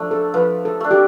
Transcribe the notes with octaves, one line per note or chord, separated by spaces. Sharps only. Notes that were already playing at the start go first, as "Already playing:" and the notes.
Already playing: F3 A3 D4
A4
F3 B4
A4
A3 D4
G4